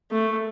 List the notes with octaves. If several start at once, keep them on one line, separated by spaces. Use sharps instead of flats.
A3